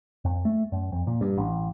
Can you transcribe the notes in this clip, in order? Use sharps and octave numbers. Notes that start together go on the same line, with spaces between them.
F2
A3
F#2
F2
A#2
G2
A1